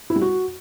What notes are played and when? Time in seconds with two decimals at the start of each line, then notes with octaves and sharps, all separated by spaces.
0.10 E4
0.16 G3
0.21 F#4